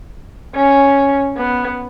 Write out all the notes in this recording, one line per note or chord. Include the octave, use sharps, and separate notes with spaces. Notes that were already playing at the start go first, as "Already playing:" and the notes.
C#4
B3